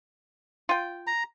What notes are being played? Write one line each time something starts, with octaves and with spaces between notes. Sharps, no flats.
F4 G5
A#5